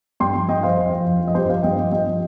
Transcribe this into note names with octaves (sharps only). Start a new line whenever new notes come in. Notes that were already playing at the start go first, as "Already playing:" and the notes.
G2 G5 C6
F3
G2 D#5 G5
F3 C5 F5
F2
F3
F2
F3
D#5
G2 G4 C5
F3 C5 F5
G2 D#5 G5
F3
G2 D#5 G5
F3